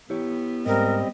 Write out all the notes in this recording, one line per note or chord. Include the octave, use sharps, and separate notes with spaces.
B3 E4 G4 C#5
G#2 G3 C4 A#4 D#5